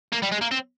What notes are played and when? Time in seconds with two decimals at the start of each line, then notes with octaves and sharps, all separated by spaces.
0.12 A#3
0.22 G3
0.32 G#3
0.41 A#3
0.51 C4